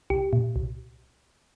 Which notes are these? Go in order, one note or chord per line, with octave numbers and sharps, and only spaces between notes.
C2 G4
A#2
C2